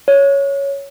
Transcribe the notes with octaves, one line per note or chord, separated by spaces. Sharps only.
C#5